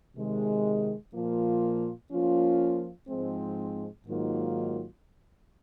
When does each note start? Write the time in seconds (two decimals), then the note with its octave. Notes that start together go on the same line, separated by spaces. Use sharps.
0.15 C3 D#3 G#3
1.13 A#2 F3 A#3 F4
2.11 F3 A#3 C#4 F4
3.08 G#2 F3 G#3 C4
4.06 G#2 D#3 F#3 A#3 F4